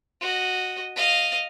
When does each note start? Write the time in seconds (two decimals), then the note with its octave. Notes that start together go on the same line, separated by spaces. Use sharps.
0.21 F#4 D#5
0.96 D#5 F5